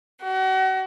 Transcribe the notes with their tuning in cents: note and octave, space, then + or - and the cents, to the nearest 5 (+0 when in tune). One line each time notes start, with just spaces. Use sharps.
F#4 +35